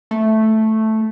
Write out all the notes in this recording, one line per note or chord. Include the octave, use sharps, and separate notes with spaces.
A3